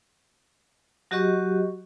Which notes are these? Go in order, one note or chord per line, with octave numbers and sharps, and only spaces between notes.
F#3 F#4 G4 D#5 C#6